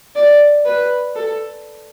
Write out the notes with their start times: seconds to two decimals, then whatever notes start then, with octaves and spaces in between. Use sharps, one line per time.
0.16 D5
0.66 B4
1.16 A4